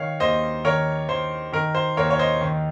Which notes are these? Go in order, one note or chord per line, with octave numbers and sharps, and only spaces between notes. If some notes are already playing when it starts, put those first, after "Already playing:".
Already playing: D#3 C#5 F5
D#2 C5 D#5
D#3 A#4 C#5
D#3 C5
D#3 A#4
C5
D#2 A#4 C#5
C#5
C5 D#5
D#3